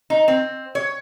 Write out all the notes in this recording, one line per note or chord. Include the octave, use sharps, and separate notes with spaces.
D#4
C4
C#5